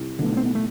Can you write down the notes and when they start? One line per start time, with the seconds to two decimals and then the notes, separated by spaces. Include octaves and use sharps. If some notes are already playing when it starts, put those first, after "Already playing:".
Already playing: C2
0.19 B2 D3 A3
0.37 C4
0.45 B3
0.55 A3